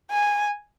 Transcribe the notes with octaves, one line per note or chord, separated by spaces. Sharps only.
G#5